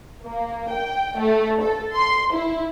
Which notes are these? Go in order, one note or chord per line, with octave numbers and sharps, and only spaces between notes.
A#3
G5
A3
A4
C6
E4